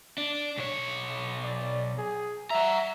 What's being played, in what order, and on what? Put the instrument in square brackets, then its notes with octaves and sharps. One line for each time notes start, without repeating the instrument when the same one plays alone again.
[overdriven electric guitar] D4
B1 C#5
[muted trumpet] D5
G#4
[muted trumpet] E5 [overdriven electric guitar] F#5 A#5